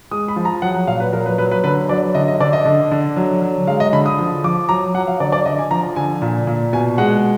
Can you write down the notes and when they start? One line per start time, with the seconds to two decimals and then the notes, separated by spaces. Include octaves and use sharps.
0.11 G#3 D#6
0.28 B5
0.36 F3
0.45 A#5
0.62 F#3 F#5
0.74 F#5
0.87 A#2 F5
1.00 B4
1.13 F#3 A#4
1.26 B4
1.38 F#3 B4
1.52 B4
1.64 D3 B4
1.89 F#3 D5
2.15 D3 D#5
2.28 D#5
2.40 D3 D5
2.53 D#5
2.65 D3
2.91 D3
3.16 F#3
3.42 F#3
3.67 G#3 F5
3.80 D#5
3.93 D3 B5
4.06 D#6
4.18 F3
4.44 F3 D6
4.69 F#3 A#5
4.94 F#3 F#5
5.07 F5
5.20 D3 D5
5.32 D5
5.46 D3 D#5
5.59 G#5
5.71 F3 A#5
5.96 D3 G#5
6.22 A#2
6.47 A#2
6.73 B2 G#5
6.98 G#3 F#5